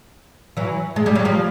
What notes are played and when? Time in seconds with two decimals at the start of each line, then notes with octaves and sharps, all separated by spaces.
0.57 E3 F#3
0.96 G#3
1.06 G3
1.15 F#3
1.25 F3 G3